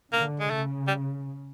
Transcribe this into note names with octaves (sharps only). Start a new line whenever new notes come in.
D3 A#3
G#3
C#3 A3
G3